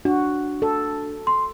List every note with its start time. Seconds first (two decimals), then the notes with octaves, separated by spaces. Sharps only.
0.05 D4 F#4
0.62 A4
1.27 C6